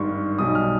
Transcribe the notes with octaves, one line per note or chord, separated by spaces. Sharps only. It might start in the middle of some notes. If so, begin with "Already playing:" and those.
Already playing: G#1 G2 D#3 G3 C6 C#6
B1 B2 G3 D#6
F6